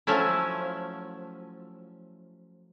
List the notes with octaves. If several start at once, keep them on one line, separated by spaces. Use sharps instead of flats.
F3 F#3 A3 C#4 E4